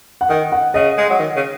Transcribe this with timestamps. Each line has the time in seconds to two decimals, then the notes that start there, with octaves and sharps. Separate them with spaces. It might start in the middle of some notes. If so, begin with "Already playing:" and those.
0.21 F#5
0.29 D#3 D#5
0.52 F#5
0.74 C#3 D#5
0.98 G#3
1.10 F#3
1.20 D#3
1.36 C#3